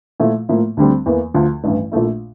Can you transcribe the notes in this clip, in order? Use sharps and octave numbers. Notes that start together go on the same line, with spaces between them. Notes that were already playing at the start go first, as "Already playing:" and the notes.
A#2 F3 A3 E4
A2 F3 A#3 E4
D2 D3 G3 C4
E2 E3 A#3
D2 D3 F3
A1 G2 E3
A#1 A#2 A3 E4